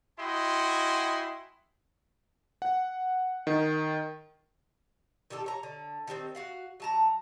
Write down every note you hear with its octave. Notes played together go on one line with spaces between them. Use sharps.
E4 F#4 D#5 G5 G#5 C6
F#5
D#3
D#3 G3 G4 A4
C#5 A#5
D3
D#3 G3 B3 C4
F#4 F5 F#5
F#3 A5 A#5